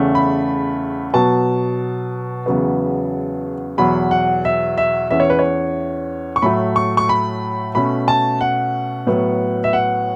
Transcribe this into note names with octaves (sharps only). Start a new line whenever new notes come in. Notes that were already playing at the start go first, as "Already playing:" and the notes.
Already playing: E2 C#3 A3 C#4
B5
B2 F#3 B3 A5
E2 C#3 F#3 B3
E2 B2 F#3 B5
F#5
E5
E5
E2 E3 C#4 E5
C#5
B4
C#5
C#6
A2 F#3 A3 B5
C#6
C#6
B5
B2 A3 C#4 B5
A5
F#5
A2 F#3 B3
E5
F#5